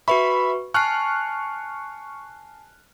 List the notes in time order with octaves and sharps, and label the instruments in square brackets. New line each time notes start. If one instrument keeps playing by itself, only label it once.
[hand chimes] F#4 B4 C#6 [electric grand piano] E5 B5
[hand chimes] G#5 A5 C7 [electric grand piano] C#6 F6 F#6